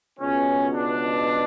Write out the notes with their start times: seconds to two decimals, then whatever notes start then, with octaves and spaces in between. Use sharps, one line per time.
0.19 C#2 B2 C#4
0.73 D4